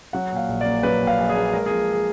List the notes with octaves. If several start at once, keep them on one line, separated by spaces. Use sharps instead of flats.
F#3 F#5
A#2 F5
A#1
A#3 D5
F#3 B4
A#2
F5
A#1
G#4
A#3
G#3 A#4
F3 G#4
G#4